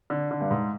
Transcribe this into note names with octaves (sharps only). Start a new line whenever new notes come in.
D3
D3
G2
G#2